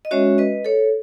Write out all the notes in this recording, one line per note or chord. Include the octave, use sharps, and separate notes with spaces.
D#5
G#3 C#4 F#4 C#5 E5
B4 D#5
A4 C#5